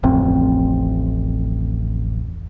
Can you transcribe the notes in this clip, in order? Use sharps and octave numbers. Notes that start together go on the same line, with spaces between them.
D1 A1 F2 C4